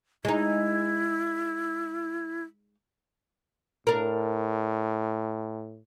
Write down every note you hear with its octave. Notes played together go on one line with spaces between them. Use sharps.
G#3 D#4 E4
A2 D4 A#4